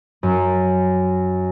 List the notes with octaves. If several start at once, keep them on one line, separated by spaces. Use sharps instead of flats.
F#2